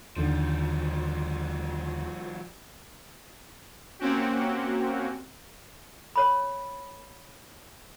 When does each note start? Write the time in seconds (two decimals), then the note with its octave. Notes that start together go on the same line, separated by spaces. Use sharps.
0.16 D#2 D3 D#3 F3 G3
3.99 A#3 C4 C#4 F#4 G4
6.16 C#5 B5